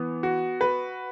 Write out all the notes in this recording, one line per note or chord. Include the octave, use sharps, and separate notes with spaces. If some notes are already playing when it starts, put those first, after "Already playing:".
Already playing: E3 B3
F#4
B4